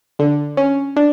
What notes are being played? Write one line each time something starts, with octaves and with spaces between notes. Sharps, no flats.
D3
C#4
D4